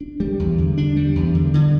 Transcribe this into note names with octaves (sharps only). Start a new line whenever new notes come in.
D4
G3
E2
D3
D4
G3
E2
D3
D3